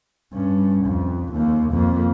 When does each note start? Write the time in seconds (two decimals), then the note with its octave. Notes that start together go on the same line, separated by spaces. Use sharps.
0.32 G2 C#4
0.85 F2
1.33 D#2 A#3
1.71 F2 A#3